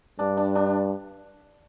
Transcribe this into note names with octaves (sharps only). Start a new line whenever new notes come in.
G2 D4
D4
D4